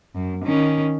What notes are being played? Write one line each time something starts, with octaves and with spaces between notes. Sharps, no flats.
F#2
D#3 C#4